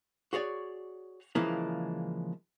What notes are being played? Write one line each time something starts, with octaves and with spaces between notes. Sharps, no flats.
F#4 G#4 C#5 D5
C#3 E3 F3 G#3 A#3 E4